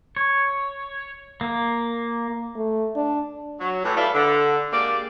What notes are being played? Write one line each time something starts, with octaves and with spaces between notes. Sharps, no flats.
C#5
A#3
A3
D4
F#3
A2 E3
F4 A4 B4 D5 E5 F5
D3
G#3 A#3 G4 D5